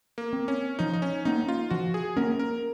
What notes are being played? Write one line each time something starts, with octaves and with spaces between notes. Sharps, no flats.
A#3
C4
C#4
F3 D#4
D#4
C#4
A#3 C#4 D#4
F4
F3 F#4
G#4
A#3 C#4 A#4
A#4